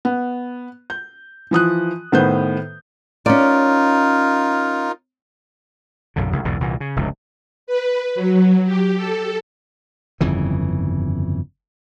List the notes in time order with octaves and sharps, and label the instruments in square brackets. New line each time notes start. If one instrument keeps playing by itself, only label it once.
[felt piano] B3
G6
E3 F3 D#6 F#6
A2 D#3 B3 B4 C5 G6
[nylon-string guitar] C#4 D5 [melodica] D#4 F4 A#4
[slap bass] B1 F#2 D3
C2 C#3 G#3
B1 E2 G#2 B2
C2 A#2 E3
C#3
F1 C#2 G2 C#3
[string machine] B4
F#3
G4
A4
[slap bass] G1 F2 C#3 E3